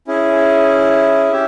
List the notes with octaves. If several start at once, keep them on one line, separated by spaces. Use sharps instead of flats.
C#4 E4 G#4
C#4 G4 E5